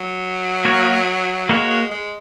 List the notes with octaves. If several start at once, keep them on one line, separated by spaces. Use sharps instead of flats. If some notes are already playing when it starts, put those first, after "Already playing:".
Already playing: F#3
A#3 F#4 A#4 C#5
G#3 A#3 F#4 A#4 C#5
G#3
G#3